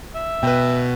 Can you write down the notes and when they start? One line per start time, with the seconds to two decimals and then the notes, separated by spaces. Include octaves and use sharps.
0.15 E5
0.43 B2 B4 G5